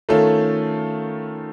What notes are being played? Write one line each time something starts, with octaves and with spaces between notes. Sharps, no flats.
D#3 A3 C#4 F4 A4